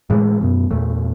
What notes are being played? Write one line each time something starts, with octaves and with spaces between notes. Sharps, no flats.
A2 E3 G#3
F#2 B2
E2 A#2 A3